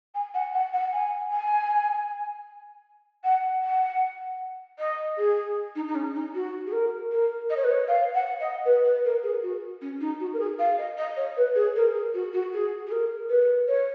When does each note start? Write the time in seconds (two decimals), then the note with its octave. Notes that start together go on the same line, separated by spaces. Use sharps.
0.14 G#5
0.34 F#5
0.54 F#5
0.73 F#5
0.92 G#5
1.32 G#5
3.24 F#5
3.62 F#5
4.79 D#5
5.18 G#4
5.75 D#4
5.87 D#4
5.95 C#4
6.14 D#4
6.34 F#4
6.66 G#4
6.72 A#4
7.11 A#4
7.50 D#5
7.56 C#5
7.64 B4
7.70 C#5
7.88 F5
8.14 F#5
8.40 D#5
8.65 B4
8.85 B4
9.05 A#4
9.23 G#4
9.42 F#4
9.81 C#4
10.00 D#4
10.20 F#4
10.33 A#4
10.39 G#4
10.59 F5
10.78 D#5
10.97 D#5
11.16 C#5
11.37 B4
11.55 G#4
11.75 A#4
11.94 G#4
12.14 F#4
12.33 F#4
12.53 G#4
12.86 G#4
12.92 A#4
13.29 B4
13.68 C#5